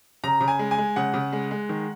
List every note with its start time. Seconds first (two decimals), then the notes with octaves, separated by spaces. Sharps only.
0.24 C#3 A#5
0.41 C#3
0.48 G#5
0.59 G#3
0.71 G#5
0.78 G#3
0.96 C#3 F#5
1.14 C#3
1.33 G#3
1.51 G#3
1.69 D#3